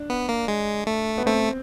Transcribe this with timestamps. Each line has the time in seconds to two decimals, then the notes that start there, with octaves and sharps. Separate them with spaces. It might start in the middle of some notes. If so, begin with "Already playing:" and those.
Already playing: D4
0.10 B3
0.29 A#3
0.48 G#3
0.87 A3
1.18 B3
1.26 A3 C4